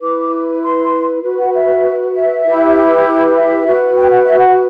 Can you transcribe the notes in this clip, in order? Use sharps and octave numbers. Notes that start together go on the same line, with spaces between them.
E4 B4 D6
C6
F#4 B4
F#5
E5
E5
E4 G4 B4
E5
F#4 B4
G5
F#5
E5
F#5